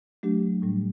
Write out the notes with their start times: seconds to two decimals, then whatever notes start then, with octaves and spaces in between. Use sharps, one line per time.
0.23 F#3 A3 D4 G4
0.62 A2 G3 D4